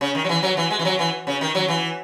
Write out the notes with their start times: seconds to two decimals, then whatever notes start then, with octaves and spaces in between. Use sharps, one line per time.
0.01 C#3
0.15 D#3
0.25 F#3
0.29 E3
0.43 F#3
0.57 E3
0.71 G#3
0.79 E3
0.85 F#3
0.99 E3
1.27 C#3
1.41 D#3
1.55 F#3
1.68 E3